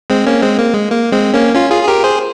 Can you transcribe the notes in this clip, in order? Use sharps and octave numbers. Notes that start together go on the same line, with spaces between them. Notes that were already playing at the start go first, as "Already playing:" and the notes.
G#3 C4
A#3 C#4
G#3 C4
A#3
G#3
A#3
G#3 C4
A#3 C#4
C#4 F4
F4 G#4
G#4
G4 A#4
G#4 C5